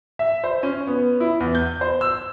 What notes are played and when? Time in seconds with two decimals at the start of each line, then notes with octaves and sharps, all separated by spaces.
0.19 E5
0.44 C5
0.63 C#4
0.87 B3
1.20 E4
1.40 E2
1.55 G6
1.81 C5
2.01 E6